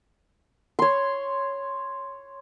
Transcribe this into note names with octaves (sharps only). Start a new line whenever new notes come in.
C#5 C6